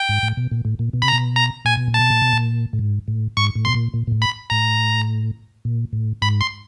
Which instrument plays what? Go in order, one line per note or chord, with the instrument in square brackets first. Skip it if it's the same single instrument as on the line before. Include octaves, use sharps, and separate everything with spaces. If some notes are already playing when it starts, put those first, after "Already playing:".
Already playing: [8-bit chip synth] G5
[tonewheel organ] G#2
A2
B2
A#2
A2
A#2
B2
[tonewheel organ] C3 [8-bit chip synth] B5
[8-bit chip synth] A#5
[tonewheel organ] B2
[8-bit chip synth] A#5
[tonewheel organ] A#2 [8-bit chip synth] G#5
[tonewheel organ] B2
A#2
[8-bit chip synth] A5
[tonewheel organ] B2
A#2
B2
A#2
A2
G#2
A2
[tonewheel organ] G#2 [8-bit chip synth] C#6
[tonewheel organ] A2
[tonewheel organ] B2 [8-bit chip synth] C6
[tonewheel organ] A#2
A#2
A#2
A2
[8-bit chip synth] B5
[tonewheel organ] A2 [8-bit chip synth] A#5
[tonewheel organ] A#2
A2
[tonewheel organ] G#2 [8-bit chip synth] B5
[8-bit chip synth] C6